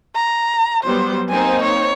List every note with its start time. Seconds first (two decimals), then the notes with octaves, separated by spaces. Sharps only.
0.15 A#5
0.84 F#3 G3 B3 C5
1.29 A#3 C4 D#4 G#5
1.63 C#5